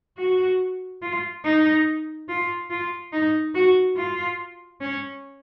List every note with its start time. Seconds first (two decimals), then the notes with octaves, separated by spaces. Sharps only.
0.18 F#4
1.02 F4
1.44 D#4
2.29 F4
2.70 F4
3.12 D#4
3.55 F#4
3.97 F4
4.81 C#4